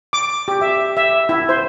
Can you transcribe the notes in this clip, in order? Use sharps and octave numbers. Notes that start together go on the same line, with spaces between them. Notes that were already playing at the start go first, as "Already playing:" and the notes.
D6
G4
E5
E5
E4
C5